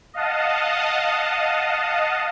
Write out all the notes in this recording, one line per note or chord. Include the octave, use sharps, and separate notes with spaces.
D#5 F5 F#5 A5 D#6